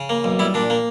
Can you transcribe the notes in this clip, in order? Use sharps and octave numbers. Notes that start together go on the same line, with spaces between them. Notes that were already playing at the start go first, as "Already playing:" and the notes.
Already playing: C#3
A#3
B1
G3 E4
A#2 D4
A#3